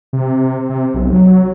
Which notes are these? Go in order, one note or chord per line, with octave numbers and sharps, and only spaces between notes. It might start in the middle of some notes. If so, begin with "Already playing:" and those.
C3
C3
B1
F#3